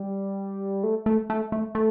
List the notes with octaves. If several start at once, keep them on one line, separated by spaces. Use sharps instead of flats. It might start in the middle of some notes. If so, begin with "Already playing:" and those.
Already playing: G3
A3
A3
A3
A3
A3